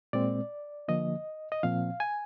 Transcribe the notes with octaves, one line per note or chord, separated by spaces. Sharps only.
A#2 G#3 C4 D5
D3 F3 A#3 D#5
D#5
A#2 F3 C4 F5
G#5